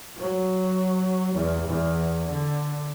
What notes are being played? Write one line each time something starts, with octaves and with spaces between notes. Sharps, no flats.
F#3
E2
E2
D3